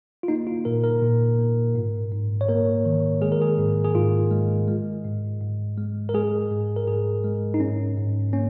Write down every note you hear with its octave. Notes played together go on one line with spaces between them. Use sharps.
F4
A#3 D#4
F4
A#2 A#4
A#4
A#2
A#3
G#2
G#2
C#5
A#3 A#4
D#3
G#3 G#4
A#4
G#4
G#2
G#4
G#2 F4
G#3
G#3
G#2
G#2
G#3
A#4
G#3 G#4
G#2
A#4
G#2 G#4
G#3
D#4
G#2 C#4
G#2
A#3 C#4